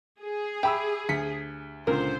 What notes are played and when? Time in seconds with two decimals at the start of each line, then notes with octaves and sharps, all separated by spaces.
0.21 G#4
0.63 G4 E5 B5 E6
1.09 D2 B6 C#7
1.87 C#2 A#2 D3 A#4 C5